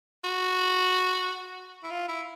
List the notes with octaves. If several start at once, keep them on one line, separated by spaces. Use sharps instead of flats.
F#4
E4
F4
E4